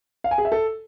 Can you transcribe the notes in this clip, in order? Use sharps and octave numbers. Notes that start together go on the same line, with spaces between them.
F5
G#5
G#4
E5
A4